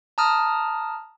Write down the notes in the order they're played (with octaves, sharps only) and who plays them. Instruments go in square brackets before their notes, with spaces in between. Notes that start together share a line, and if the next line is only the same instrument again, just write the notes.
[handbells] A5 A#5 D#6 F6